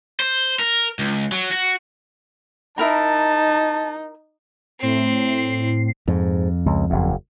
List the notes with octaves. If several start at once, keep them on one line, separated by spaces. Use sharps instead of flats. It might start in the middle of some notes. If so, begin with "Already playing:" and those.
C5
A#4
C#2
F#3
F#4
D#4 E4 A#4 A5 A#5
A2 C4 C7
F2 G#2
C#2
F#1 E2